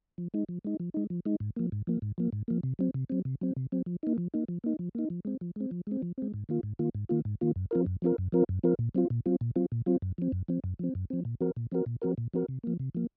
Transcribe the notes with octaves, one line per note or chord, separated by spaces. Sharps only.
F3
G#3 D#4
F3
G#3 D#4
F3
G#3 D#4
F3
G#3 D#4
G#2
F3 A#3
G#2
F3 A#3
G#2
F3 A#3
G#2
F3 A#3
C3
F#3 C4
C3
F#3 C4
C3
F#3 C4
C3
F#3 C4
F3
A#3 D#4
F3
A#3 D#4
F3
A#3 D#4
F3
A#3 D#4
F3
G#3 C4
F3
G#3 C4
F3
G#3 C4
F3
G#3 C4
G#2
D#3 A#3 F4
G#2
D#3 A#3 F4
G#2
D#3 A#3 F4
G#2
D#3 A#3 F4
F#2
F3 C4 F4 A#4
F#2
F3 C4 F4 A#4
F#2
F3 C4 F4 A#4
F#2
F3 C4 F4 A#4
A#2
F#3 C4 F4
A#2
F#3 C4 F4
A#2
F#3 C4 F4
A#2
F#3 C4 F4
F#2
F3 C4
F#2
F3 C4
F#2
F3 C4
F#2
F3 C4
A#2
F3 C4 F#4 A#4
A#2
F3 C4 F#4 A#4
A#2
F3 C4 F#4 A#4
A#2
F3 C4 F#4 A#4
C3
F3 A#3
C3
F3 A#3